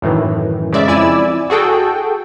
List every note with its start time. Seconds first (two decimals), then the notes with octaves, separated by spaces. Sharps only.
0.02 F#2 A2 D#3 E3
0.72 C#3 G#3 D5 E5
0.87 F2 E4 D5 G#5 E6
1.50 F#4 G#4 A4 G5